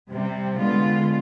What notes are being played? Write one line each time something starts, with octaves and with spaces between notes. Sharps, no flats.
C3 G3 C4
D3 G#3 B3 F4